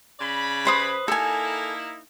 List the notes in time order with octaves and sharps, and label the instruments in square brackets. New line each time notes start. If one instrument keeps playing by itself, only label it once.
[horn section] C#3 D5 B5
[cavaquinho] B4 C5 D#6
[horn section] A#3 D#4 E4 [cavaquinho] A4 G#5